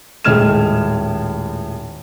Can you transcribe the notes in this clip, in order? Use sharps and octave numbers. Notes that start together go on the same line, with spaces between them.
D#1 A2 G#3 F6 G#6 E7